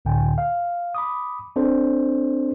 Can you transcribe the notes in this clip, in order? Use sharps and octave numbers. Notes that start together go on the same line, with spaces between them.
C#2 A2 D3 G5 G#5
F5
B5 D6 D#6
C4 D4 A4 C5